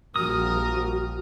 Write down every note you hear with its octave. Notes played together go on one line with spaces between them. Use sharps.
A#1 F3 G3 F#4 A#4 D#6